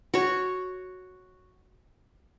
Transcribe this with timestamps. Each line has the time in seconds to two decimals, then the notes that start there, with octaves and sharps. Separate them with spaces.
0.14 F#4 C#5